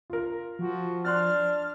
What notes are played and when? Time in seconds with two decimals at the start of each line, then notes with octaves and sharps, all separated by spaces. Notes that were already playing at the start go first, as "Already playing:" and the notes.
0.10 F4 A#4
0.59 F3 F#4
1.05 D4 C6 F6 F#6 A6